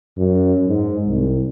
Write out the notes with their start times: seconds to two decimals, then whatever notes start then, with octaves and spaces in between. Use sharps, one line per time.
0.18 F#2
0.67 G#2
1.07 C2